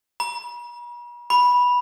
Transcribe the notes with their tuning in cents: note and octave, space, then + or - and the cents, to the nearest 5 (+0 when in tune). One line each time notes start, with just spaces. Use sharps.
B5 -45
B5 -10